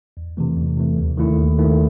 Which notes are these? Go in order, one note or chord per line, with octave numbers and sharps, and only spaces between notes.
E2
C3 E3 A3
E2
C3 E3 A3
D#2
D#3 A3 E4
D#2
D#3 A3 E4